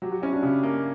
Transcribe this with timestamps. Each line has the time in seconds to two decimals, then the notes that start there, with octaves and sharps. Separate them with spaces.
0.02 F#3 G4
0.12 F#4
0.22 C#4 E4
0.32 D4 F#4
0.43 C#3 E4 G4
0.63 A#3